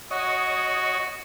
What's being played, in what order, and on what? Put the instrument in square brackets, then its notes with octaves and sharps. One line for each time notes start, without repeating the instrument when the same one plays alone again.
[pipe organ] F#4 [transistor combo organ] C#5 D#5